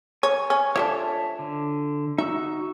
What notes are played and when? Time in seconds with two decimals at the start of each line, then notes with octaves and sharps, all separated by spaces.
0.23 C#5 G#5
0.50 C#4
0.76 F3 A3 D4 C#5 E5 A5
1.39 D3
2.18 D#4 F#4 E5 E6